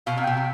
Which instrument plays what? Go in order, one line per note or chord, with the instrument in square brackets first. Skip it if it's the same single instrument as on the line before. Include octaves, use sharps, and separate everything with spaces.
[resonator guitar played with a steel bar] B2 [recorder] F5
[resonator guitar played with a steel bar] C3
[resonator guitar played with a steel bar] B2 [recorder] G5
[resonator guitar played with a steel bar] C3